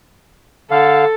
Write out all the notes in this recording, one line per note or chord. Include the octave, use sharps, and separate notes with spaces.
D3 A4 F5